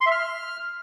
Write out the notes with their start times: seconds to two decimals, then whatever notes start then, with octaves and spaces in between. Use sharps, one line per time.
0.01 C6
0.06 E5
0.11 F6